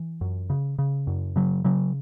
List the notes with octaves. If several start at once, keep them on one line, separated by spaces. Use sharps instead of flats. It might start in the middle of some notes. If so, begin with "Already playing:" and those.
Already playing: E3
F#2
C#3
C#3
F#2
C#3 F#3
C#3 F#3